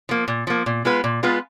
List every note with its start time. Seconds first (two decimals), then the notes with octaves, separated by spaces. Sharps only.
0.09 F3 A#3
0.28 A#2
0.47 F3 A#3
0.66 A#2
0.85 G#3 B3 F4 B4
1.04 A#2
1.23 G#3 B3 F4 B4